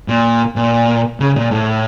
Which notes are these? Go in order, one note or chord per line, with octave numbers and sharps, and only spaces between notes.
A#2
A#2
C#3
A#2
A2